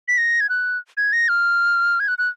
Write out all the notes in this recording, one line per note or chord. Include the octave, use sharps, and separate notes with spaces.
B6
A#6
G#6
F#6
G#6
A#6
F6
G#6
F#6
F#6